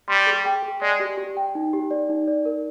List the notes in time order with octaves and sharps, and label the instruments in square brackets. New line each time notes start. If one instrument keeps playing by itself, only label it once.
[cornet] G3 [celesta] C6
[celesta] G#4
G5
G#4
[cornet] G#3 [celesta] D5
[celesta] G4
G4
G5
D#4
G4
D5
D#4
D5
A#4